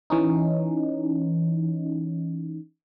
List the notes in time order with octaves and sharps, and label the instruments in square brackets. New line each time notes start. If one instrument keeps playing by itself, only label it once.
[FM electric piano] E3 C#4 D#4